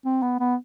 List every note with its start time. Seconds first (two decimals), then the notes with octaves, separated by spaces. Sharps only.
0.05 C4
0.22 B3
0.40 B3